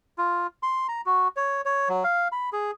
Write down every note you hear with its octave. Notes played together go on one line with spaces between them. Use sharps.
F4
C6
A#5
F#4
C#5
C#5
F#3
F5
B5
G#4